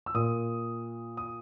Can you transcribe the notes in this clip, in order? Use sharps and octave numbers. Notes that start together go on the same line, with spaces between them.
E6
A#2 D#6
D#6